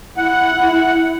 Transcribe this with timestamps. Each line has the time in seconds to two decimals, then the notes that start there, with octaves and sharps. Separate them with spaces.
0.17 E4 F#5